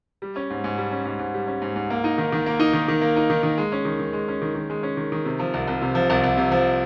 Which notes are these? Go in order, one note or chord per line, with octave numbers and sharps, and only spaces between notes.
G3
C#4
G#2
G#2
G3
C#4
G#2
G#2
G3
C#4
G#2
G#2
A#3
D#4
D#3
D#3
A#3
D#4
D#3
D#3
A#3
D#4
D#3
D#3
G#3
C#4
D#3
D#3
G#3
C#4
D#3
D#3
G#3
C#4
D#3
D#3
C3
F3
C2
C2
C3
F3
C2
C2
C3
F3